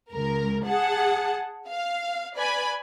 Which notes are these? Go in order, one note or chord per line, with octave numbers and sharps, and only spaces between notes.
C#2 A#4
G#4 F#5 A5
F5
B4 D5 G#5 B5